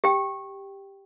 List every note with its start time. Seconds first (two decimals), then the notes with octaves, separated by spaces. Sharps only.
0.04 G4 G5